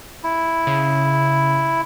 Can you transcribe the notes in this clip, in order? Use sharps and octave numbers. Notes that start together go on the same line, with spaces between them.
E4
C#3